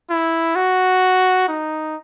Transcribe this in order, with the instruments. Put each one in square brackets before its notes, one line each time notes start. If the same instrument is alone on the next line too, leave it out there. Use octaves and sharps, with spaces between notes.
[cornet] E4
F#4
D#4